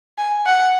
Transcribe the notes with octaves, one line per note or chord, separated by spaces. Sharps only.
G#5
F#5